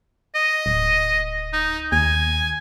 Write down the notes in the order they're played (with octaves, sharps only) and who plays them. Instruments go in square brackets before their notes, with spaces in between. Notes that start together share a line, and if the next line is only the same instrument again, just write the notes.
[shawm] D#5
[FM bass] D1
[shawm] D#4
[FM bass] D#2 [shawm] G#5